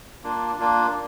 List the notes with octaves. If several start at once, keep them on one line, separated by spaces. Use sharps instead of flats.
A#3 D4 F4
A#3 D4 F4